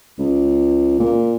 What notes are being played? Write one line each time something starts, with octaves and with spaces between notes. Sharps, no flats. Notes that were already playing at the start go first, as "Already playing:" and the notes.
C#2
A#2